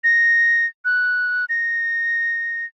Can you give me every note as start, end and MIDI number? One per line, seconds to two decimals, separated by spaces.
0.04 0.66 94
0.85 1.45 90
1.49 2.65 94